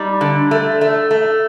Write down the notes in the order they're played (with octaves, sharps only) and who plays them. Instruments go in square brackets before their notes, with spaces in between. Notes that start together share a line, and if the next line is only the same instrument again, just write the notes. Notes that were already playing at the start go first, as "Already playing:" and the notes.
Already playing: [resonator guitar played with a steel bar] G3 D#4
D3
A3
A3
A3